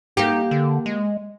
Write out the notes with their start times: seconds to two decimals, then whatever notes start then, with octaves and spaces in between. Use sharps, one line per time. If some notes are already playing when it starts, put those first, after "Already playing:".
0.17 A#3 D#4 G4
0.51 D3
0.86 G#3